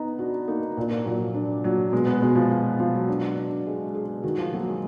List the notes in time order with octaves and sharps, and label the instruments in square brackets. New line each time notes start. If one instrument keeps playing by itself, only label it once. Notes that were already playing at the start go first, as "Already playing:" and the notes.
Already playing: [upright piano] B3 [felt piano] D#4
[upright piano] D4 [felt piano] F#4
[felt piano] A#3 [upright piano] D#4
[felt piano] A#2 [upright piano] D4
[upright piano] A#3
[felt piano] A#2 [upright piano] F#3
[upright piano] F3
[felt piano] D4
[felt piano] A#2 [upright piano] F#3
[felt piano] B2 [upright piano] G#3
[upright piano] B3
[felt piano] B2 [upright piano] G#3
[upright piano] F3
[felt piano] F4
[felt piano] B2 [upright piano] F3
[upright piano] F#3
[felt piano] D4
D4
G#3
G#4
[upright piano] D#3 [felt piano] F#4
[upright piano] F3
[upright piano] F#3 [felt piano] A#3
[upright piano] G#3